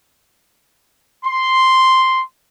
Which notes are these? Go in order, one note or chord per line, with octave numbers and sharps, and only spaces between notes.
C6